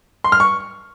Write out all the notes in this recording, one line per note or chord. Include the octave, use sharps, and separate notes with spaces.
C6
F6
C#6